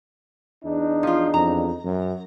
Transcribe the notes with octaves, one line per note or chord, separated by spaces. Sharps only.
E2 D4 D#4
F3 F4
F2 A#5
F#2